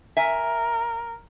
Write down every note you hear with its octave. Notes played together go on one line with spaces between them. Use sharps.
A#4 E5 G#5